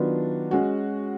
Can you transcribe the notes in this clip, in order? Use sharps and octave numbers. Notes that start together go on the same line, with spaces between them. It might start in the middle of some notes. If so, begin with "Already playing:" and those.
Already playing: D#3 F#3 B3 D4 F4
G#3 C#4 F#4